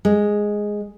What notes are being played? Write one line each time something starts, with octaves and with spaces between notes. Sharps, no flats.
G#3